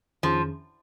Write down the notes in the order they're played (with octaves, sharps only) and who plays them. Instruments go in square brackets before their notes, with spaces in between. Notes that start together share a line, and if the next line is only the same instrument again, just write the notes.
[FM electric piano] F2 D#3 C#4 G#4 [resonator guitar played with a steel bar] F3